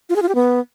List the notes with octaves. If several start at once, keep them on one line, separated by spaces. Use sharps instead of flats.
F4
G#4
F4
G4
B3